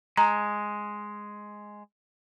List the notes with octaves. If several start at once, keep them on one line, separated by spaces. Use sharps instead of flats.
G#3 A#5